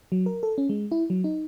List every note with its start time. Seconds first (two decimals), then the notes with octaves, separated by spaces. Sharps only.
0.12 F#3
0.26 A#4
0.43 A4
0.58 C#4
0.69 G#3
0.92 E4
1.10 F#3
1.24 D#4